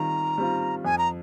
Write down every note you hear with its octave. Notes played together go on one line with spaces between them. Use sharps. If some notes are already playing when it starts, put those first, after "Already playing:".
Already playing: D#3 G3 C4 F4 A#5
G3 C4 F4
F2 G#5
A#5